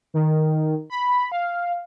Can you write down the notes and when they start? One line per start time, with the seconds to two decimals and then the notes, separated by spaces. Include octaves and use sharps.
0.14 D#3
0.90 B5
1.32 F5